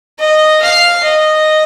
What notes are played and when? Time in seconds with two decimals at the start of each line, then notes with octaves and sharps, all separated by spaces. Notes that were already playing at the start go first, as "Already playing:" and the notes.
0.19 D#5
0.62 F5
1.03 D#5